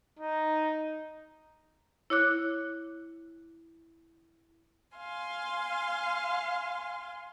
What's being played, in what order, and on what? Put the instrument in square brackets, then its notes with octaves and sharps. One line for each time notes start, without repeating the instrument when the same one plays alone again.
[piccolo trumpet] D#4
[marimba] E4 C#5 D6 F#6
[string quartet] F5 G#5 C6